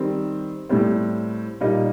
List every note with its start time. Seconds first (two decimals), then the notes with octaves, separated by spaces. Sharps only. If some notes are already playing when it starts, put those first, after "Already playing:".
Already playing: D#3 G3 C4
0.69 A2 G3 C4
1.61 A#2 G3 A#3 D#4